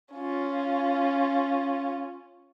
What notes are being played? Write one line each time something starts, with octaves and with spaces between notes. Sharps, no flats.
C#4 F4